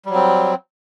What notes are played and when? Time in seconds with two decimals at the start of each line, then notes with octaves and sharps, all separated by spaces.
0.05 G3
0.10 F#3
0.14 C4